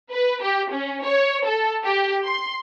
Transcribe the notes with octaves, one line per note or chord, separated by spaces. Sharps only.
B4
G4
C#4
C#5
A4
G4
C6